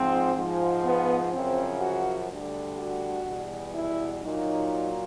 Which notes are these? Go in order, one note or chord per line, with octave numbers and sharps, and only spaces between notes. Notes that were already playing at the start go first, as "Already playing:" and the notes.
Already playing: G#2 F3 C4
G#2 F3
B3
F#2 C#3 F3 C4
F#4
D2 D3 G3
F#4
E2 B2 G3
E4
A#2 F#3 D#4